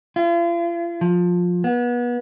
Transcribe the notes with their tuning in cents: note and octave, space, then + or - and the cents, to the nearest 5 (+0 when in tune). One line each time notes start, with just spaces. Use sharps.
F4 -40
F3 +20
B3 -30